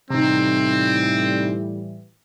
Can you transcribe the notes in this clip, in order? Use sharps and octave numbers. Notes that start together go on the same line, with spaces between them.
A2 C3 E3 G3 C4 D#4